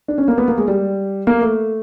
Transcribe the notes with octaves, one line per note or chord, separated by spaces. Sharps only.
D4
C#4
A#3
B3
A#3
G#3
G3
A#3
A3